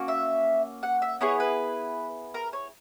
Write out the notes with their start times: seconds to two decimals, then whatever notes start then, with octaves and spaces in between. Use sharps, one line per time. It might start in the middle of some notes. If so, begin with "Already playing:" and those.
Already playing: A#3 C#4 F#4
0.08 E5
0.83 F#5
1.02 E5
1.21 B3 E4 G#4 C#5
1.40 B4
2.34 A#4
2.53 C#5